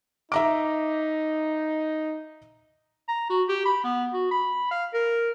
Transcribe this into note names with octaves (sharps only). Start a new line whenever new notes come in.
D#4 E5 A#5 D6
A#5
F#4
G4
B5
B3
F#4
B5
F5
A#4